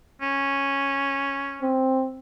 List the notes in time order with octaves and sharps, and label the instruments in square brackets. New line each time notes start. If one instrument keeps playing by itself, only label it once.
[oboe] C#4
[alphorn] C4